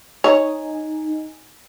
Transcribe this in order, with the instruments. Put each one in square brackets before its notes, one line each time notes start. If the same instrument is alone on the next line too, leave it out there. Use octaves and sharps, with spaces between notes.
[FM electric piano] D#4 G#5 [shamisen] C#5